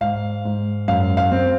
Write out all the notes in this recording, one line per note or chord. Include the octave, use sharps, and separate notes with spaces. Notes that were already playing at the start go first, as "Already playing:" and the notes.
G#2 F5
G#2
F#2 F5
F5
C4